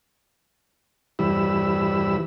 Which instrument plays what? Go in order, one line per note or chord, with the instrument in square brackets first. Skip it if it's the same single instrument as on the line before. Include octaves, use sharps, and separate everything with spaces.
[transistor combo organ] E2 G2 E3 G3 B5 E6